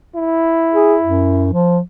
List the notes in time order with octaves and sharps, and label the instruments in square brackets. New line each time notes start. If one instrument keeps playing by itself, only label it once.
[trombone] E4
[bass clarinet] G#4
F#2
F3